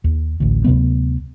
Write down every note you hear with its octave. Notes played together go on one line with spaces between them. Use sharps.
D#2
A1 D2
D2 C3 F#3 B3